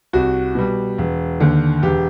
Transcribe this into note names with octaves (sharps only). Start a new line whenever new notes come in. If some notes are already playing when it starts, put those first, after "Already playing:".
C2 F#4
B2 G3
E1
D#2 D3
E1 G4